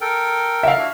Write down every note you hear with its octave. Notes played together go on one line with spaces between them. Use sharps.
A4 A#4 G5
E5 F5
D4 E4 F#4